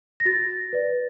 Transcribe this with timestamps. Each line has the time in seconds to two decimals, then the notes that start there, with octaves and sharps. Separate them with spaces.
0.20 A#6
0.25 F#4 A6
0.73 B4 D5